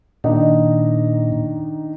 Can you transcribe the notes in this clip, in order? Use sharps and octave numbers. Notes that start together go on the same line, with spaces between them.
A#2 D#3 D4 D#4